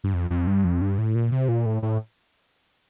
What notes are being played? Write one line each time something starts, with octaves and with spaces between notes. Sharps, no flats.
G2
F2
F2
G2
F2
G2
A2
A#2
C3
A#2
A2
A2